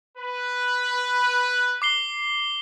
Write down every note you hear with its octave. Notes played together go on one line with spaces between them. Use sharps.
B4
D6 C7 G7